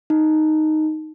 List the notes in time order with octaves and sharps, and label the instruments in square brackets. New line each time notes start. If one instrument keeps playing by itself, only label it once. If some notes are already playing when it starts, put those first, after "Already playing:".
[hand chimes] D#4